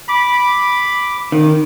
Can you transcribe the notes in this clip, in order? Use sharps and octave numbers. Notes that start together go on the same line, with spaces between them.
B5 D6
D#3